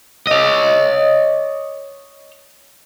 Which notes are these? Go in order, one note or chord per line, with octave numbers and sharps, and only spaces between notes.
C#5 D#5